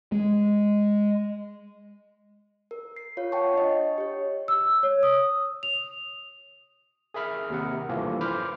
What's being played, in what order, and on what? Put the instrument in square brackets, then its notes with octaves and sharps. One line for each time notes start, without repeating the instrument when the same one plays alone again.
[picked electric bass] G#3
[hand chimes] A#4
C7
F4 C#5 F5
F#5 G5 A5 C#6
D4 D#5
G4 C#5
[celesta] E6
C#5
D#6
F7
[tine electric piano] G#4 A#4 E5 B5 F6
D#2 C3 A#4 F#5
G2 E3 F3 A3 A#3
B4 C5 B5 D6 F6